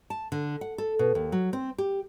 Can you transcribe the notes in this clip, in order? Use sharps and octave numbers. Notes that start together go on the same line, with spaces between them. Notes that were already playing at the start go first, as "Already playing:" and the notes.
A5
D3
F#5
A4
B2
D#2
F#3
C4
G4